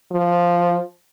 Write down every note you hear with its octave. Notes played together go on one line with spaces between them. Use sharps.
F3